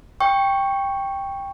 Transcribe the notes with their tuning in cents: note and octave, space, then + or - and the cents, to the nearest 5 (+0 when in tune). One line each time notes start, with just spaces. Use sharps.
G5 +10 C#6 +0